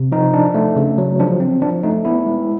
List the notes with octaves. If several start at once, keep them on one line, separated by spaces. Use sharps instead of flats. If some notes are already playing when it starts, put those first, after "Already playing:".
Already playing: C3
F3 D#4
D4
A3
C#3
F#3
F3 D4
C4
F3 D4
A3 D#4
B3 E4
G#3